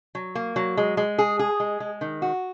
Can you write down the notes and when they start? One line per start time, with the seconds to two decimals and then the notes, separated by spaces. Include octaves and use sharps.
0.15 F#3
0.35 A#3
0.56 F#3
0.77 G#3
0.97 G#3
1.18 G#4
1.39 G#4
1.60 G#3
1.80 G#3
2.01 D#3
2.22 F#4